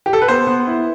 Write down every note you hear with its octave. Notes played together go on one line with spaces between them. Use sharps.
G4
A4
B4
B3 C5
B3
E4